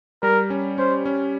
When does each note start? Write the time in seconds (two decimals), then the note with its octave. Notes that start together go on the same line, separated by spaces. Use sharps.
0.23 G3 A#4
0.50 C#4
0.78 C#4 C5
1.06 C#4